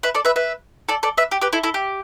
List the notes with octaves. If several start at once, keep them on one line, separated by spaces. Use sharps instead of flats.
B4 E5
A4 D5
B4 E5
B4 E5
A4 D5
A4 D5
B4 E5
G4
G4 B4
E4 A4
E4 A4
G4